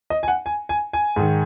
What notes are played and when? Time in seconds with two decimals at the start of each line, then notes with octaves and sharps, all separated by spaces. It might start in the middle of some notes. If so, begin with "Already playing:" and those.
0.10 D#5
0.23 G#5
0.28 F#5
0.46 G#5
0.69 G#5
0.93 G#5
1.16 G#2 D#3